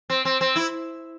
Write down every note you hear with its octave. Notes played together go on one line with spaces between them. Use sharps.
C4
C4
C4
E4